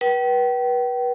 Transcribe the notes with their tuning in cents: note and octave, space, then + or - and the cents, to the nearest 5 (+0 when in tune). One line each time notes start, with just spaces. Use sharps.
B4 -30 G5 -35